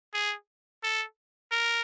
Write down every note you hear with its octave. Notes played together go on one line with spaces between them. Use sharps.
G#4
A4
A#4